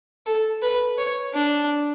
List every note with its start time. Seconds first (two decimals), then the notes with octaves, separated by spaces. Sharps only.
0.26 A4
0.62 B4
0.98 C#5
1.34 D4